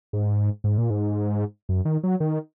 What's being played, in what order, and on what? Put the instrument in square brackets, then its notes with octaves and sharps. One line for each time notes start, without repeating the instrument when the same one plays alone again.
[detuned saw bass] G#2
G#2
A#2
G#2
F#2
D#3
F#3
D#3